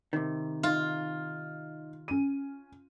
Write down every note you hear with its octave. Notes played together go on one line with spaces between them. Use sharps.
C3 D#3
D#4 F4
C#4 D#7